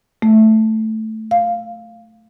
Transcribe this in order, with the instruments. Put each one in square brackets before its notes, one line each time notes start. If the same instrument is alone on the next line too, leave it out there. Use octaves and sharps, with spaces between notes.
[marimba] A3
F5